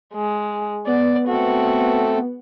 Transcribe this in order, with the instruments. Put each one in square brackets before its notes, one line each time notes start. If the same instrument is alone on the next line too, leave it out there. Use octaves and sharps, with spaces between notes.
[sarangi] G#3
[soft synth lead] B3 [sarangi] D5
[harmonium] A3 C4 A4 [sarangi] F#4